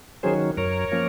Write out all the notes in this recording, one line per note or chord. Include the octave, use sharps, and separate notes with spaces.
D#3 F#3 C#4 G#4 C5
F#2 A#4 C#5
F3 A#3 C#4